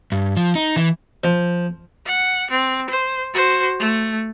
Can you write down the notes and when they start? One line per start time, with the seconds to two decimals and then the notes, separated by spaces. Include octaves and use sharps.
0.12 G2
0.37 F3
0.55 D#4
0.76 E3
1.24 F3
2.05 F#5
2.50 C4
2.89 C5
3.33 F#4 C5
3.79 A3